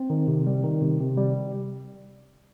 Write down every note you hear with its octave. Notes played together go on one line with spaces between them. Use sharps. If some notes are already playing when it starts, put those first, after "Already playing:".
Already playing: C4
D#3
C3
G3
D#3
C3
C3
G3